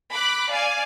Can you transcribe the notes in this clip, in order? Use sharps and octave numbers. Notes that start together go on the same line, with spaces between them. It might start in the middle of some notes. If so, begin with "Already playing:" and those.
B5 D6 F#6
D5 F5 G#5